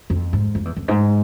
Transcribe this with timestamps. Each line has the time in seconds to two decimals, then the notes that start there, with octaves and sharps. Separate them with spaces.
0.10 F2
0.33 G#2
0.55 F2
0.65 E2
0.77 F2
0.88 G#2